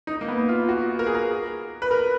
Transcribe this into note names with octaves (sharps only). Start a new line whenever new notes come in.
D#4
A#3
B3
F4
F#4
A#4
G#4
A#4
B4
A#4